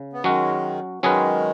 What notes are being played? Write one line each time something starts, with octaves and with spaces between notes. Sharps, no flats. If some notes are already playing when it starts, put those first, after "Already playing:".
Already playing: C#3
B3
D#3 F#3 G#3 C#4 F#4
D#3 F#3 G#3 C#4 G#4 B4